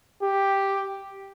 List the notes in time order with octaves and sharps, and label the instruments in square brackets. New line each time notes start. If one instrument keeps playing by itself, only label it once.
[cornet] G4